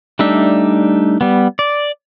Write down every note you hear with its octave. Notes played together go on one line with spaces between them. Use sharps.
G3 A3 D4 D#4 E5
G3 B3
D5